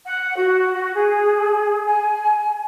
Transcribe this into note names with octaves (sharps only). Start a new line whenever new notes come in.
F#5
F#4
G#4
G#5